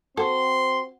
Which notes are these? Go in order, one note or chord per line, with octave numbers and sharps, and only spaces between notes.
C4 F#4 A4 C6